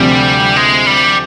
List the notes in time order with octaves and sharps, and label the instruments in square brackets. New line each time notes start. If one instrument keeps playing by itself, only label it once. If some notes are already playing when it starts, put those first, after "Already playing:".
Already playing: [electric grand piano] D2 C3 F3 C4 [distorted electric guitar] G3
[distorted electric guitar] G#3
G3